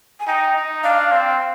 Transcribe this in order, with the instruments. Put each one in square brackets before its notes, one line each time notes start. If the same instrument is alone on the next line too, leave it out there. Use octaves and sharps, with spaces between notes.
[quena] G#5
[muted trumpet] D#4 [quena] G5
[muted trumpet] D#4
[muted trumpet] D4 [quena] F5
[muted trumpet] C4